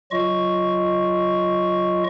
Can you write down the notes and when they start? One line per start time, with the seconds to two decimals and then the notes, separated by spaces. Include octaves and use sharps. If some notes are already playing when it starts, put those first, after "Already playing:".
0.11 F#3 F4 D#5 C#6